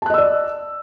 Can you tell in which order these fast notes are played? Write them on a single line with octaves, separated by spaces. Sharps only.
A5 F#6 D#5 E6 D5